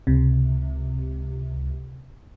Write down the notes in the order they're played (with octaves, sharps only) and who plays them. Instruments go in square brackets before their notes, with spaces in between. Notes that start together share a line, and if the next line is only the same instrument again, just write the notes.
[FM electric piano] C#2 C3